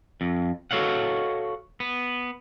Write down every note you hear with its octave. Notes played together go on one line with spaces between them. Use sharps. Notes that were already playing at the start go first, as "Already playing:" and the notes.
F2
F#4 A4 C#5 F5 F#5
B3